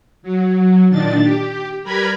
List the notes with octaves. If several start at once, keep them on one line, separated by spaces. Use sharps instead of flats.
F#3
A#2 D#3 D4 A6
G4
G3 A#4 B4 A#5 B5 G#6